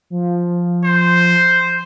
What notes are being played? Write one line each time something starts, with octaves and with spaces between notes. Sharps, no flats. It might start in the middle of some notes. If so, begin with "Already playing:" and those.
F3
C5